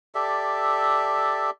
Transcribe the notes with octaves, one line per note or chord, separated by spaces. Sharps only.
G4 A4 D5 E5